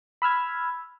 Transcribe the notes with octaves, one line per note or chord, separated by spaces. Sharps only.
B5 E6 F6 G#6